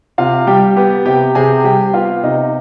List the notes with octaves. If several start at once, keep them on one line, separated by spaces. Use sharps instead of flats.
C3 F4 F5
G3 G4 G5
B3 G4 G5
C3 G4 G5
C3 G#4 G#5
G3 G4 G5
B3 F4 F5
C3 D#4 D#5